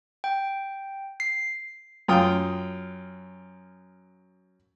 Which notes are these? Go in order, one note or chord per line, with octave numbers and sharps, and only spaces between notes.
G5
C7
F#2 F4 G5 D#6